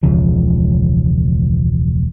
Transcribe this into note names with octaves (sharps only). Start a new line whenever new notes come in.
E1 C#2 C#3 F3